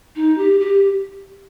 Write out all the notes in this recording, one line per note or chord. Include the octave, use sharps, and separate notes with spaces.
D#4
G4
G4